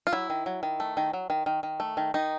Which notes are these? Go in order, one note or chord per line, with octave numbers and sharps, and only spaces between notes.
F4
F#3 E4
D#3
F#3
D#3
A3
D#3
F#3
D#3
D#3
D#3
A3
D#3
D#3 D#4